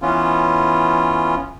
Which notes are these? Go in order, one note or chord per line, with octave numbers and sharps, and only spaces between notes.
E3 B3 C#4 F4